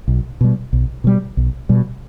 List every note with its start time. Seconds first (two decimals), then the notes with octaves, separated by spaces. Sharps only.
0.08 B1
0.41 B2 G3
0.73 B1
1.04 B2 G3
1.37 B1
1.69 B2 G3